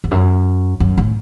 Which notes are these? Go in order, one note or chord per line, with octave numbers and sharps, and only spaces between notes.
E2
F#2
F#2
A2